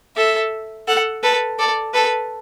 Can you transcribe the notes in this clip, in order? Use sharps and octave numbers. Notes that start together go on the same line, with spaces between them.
A4 E5
A4 F#5
A4 B4
A4 D5
A4 B4